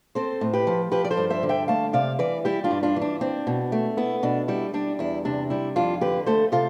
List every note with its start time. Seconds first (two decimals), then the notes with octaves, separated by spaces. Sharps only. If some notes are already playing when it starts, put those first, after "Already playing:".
0.15 C4 A4 C5
0.41 A2
0.53 G4 B4
0.67 F3
0.91 F3 G4 B4
1.05 D5
1.11 A4 C5
1.17 G2
1.30 C5 E5
1.43 D3
1.49 E5 G5
1.68 A3 F5 A5
1.93 C3 D5 F5
2.19 E3 B4 D5
2.45 G3 E4 G4
2.64 D4 F4
2.71 G2
2.83 D4 F4
2.96 E3
3.02 D4
3.21 C4 D4
3.47 B2
3.72 A3
3.97 B3 E4
4.23 B2 D4
4.48 G3 E4
4.74 G3 D4
4.99 E2 E4
5.25 C3 D4
5.50 G3 E4
5.76 F2 D4 F4
6.01 D3 G4 B4
6.26 A3 A4 C5
6.52 C3 F4 A4